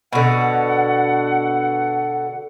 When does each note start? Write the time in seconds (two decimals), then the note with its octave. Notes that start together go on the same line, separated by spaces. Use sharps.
0.13 B2 D3 F#5